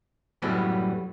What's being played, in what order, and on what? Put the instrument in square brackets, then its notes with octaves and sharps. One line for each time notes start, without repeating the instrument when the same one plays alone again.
[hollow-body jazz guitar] F#2 A2 F#3 G3 B3